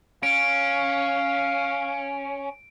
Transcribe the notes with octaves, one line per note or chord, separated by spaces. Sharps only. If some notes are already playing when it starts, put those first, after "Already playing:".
C#4 F5 D7